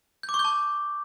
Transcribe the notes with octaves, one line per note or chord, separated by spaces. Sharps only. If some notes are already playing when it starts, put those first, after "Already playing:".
G6
D6
C#6
G6
A5